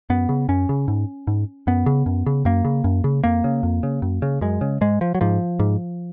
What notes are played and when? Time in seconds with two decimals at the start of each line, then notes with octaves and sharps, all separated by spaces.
0.10 F#2 B3
0.29 C#3
0.49 F#2 C#4
0.69 C#3
0.88 G#2
1.27 G#2
1.67 F#2 B3
1.86 C#3
2.06 F#2
2.26 C#3
2.45 F#2 A#3
2.65 C#3
2.84 F#2
3.04 C#3
3.24 F2 A#3
3.44 C#3
3.63 F2
3.83 C#3
4.02 F#2
4.22 C#3
4.41 F#2 G#3
4.61 C#3
4.81 G#2 G#3
5.01 F3
5.15 F#3
5.21 G#2 F3
5.59 G#2